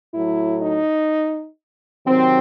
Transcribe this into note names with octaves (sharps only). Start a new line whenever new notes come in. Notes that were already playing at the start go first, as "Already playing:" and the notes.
A2 F#3 E4
D#4
C3 D#3 F#3 C4